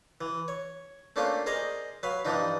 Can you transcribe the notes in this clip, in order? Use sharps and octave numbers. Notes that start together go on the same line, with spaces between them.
E3
C#5
A3 A#3 C#4 D4 F4 C5
G#4 A#4 C5 D5 D#5
F#3 B4 F5
G2 E3 F3 D4 D#4